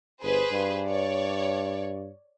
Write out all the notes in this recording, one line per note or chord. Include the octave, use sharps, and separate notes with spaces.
G1 G#4 B4 C5
G2
C#5 D5